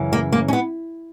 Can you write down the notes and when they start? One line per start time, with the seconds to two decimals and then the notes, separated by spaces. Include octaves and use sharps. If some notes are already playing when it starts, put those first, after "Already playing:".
Already playing: F#2 C#3 E3
0.13 A#3
0.32 A#3
0.48 C#4
0.53 B3